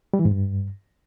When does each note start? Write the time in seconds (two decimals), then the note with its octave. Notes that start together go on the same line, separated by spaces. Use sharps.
0.14 G3
0.19 E3
0.25 G#2
0.31 G2